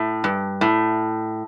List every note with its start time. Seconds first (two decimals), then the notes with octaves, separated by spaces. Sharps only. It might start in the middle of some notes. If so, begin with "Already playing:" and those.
Already playing: A2
0.24 G2
0.61 A2